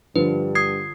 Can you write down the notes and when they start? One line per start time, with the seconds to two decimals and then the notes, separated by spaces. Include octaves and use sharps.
0.16 G2 D3 F3 B4
0.55 D#6 G#6 C7